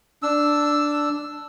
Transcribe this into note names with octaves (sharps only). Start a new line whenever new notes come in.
D4 E6